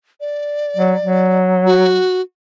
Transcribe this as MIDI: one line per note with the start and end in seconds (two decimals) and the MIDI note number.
0.21 1.38 74
0.77 0.94 54
1.02 2.03 54
1.66 2.21 66